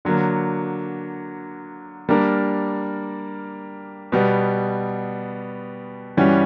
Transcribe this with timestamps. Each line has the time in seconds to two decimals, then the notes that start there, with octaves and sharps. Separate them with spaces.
0.05 D3 F#3 A#3
2.09 G3 A#3 D4 A#4
4.12 B2 G3 B3
6.17 G2 E3 G3 C#4 F#4